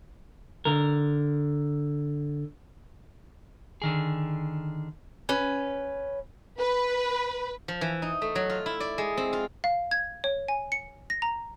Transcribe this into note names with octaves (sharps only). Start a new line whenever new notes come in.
D3 A#4
D3 D#3 G#4
C#4 B4
B4
F3
E3
D#4
A3
F#3
F4
E4
D5
G#3
C4
F4
F5
G#6
C#5
G#5
C#7
A#6
A#5